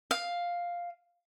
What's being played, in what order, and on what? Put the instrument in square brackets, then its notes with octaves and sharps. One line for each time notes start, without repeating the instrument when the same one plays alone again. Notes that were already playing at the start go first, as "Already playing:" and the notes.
[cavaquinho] F5